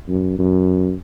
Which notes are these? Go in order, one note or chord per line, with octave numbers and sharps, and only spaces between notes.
F#2
F#2